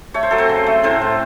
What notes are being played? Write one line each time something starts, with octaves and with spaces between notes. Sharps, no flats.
A3 C#5
C5
F#3 A4
C4 C5
C#3
A3
A2 C4 C5
A2